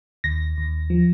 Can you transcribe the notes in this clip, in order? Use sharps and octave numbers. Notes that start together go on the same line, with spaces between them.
D#2 A#6
D#2
F3